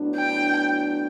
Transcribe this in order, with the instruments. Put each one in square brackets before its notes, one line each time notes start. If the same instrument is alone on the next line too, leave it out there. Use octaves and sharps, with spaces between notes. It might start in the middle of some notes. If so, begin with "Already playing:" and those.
Already playing: [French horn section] A2 F#3 B3 D4
[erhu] G5